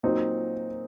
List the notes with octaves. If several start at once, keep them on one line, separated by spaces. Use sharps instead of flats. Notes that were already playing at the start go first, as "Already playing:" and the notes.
A#2 F#3 C4 D#4